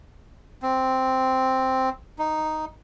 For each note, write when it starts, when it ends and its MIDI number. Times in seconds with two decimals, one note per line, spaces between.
0.62 1.89 60
2.19 2.65 63